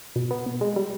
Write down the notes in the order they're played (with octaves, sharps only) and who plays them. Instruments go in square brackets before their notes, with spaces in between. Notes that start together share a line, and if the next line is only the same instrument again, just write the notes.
[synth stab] B2
B3
B2
G#3
G3